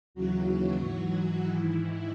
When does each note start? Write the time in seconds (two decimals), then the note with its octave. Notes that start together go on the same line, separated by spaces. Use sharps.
0.14 D#2 C#3 E3 F#3 F#4
0.78 G#2 E3
1.40 G#2 D#3 E3 E4